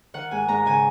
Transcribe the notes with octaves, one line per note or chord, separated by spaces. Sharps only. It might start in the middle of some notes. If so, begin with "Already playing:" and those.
D#3 F#5
G#2 G#5
G#2 A#5
C#3 G#5